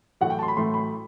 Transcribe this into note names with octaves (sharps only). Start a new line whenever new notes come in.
A1 A2 F#3 A3 F#5
G5
A5 C6
B5
A1 A2 F#3 A3 C6
B5